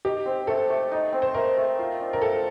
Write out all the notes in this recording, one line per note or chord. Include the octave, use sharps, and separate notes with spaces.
D#4 G4
C4
A3 A4
A3
D#4
C4
C5
A3 A#4
A3
F4
D4
A#4
A3 A4